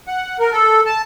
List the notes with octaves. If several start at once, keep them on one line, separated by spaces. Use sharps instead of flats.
F#5
A#4
A4
A5